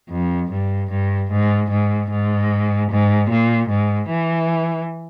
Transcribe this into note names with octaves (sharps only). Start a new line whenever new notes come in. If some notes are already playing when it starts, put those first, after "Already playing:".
F2
G2
G2
G#2
G#2
G#2
G#2
A#2
G#2
E3